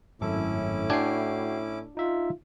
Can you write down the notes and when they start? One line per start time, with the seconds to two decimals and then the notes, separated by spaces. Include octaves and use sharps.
0.21 G#1 F#2 A2 C#4 E4 A4 D6
0.90 D4 F#4 G5 G#5 C7
1.97 D#4 F4 E5